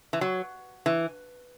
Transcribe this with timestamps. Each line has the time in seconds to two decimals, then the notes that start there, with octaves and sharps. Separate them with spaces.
0.13 E3
0.21 F#3
0.86 E3